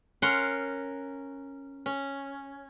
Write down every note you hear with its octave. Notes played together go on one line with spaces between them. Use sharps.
C#4 A#4 F#5 C6
C#4